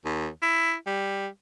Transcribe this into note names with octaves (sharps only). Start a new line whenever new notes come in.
D#2
E4
G3